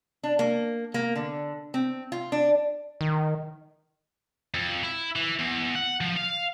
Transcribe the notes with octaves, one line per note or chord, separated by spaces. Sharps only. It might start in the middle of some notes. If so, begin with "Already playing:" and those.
D4
A#3
A#3
D3
C4
F4
D4
D#3
F2
E4
E3
E2
F#5
F3
F5